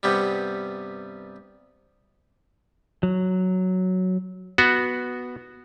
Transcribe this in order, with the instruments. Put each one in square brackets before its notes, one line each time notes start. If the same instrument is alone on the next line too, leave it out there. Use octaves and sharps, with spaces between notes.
[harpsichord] G2 C3 G3 B3
[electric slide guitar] F#3
[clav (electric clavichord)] B3 F#4